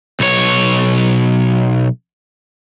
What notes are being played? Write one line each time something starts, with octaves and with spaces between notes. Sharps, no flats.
B1 C#5